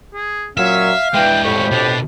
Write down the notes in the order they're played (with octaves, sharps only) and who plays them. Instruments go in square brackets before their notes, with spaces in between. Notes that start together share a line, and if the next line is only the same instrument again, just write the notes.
[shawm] G#4
[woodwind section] A#2 F#3 C#4 [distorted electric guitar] E5 [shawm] F5
[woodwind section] E3 G5 [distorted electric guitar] G#3 D4
[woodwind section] F2 A2 G4 [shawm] C#6
[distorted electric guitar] B2 [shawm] D4